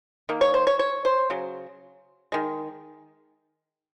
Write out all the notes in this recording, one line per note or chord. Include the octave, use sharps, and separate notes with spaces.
D#3 A#3
C#5
C5
C#5
C#5
C5
C#3 F#3
D#3 G#3